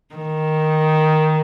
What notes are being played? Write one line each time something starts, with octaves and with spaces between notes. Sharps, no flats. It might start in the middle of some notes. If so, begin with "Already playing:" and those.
D#3